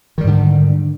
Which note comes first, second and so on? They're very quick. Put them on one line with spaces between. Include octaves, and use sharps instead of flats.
D#3 G3 G#2 D3